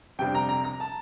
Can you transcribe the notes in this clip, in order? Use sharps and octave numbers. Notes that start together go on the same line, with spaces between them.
F2 C3 G3 D4 G5
A#5
A#5
A#5
A5